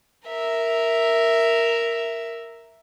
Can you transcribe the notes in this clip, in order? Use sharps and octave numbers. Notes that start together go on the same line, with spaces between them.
A#4 E5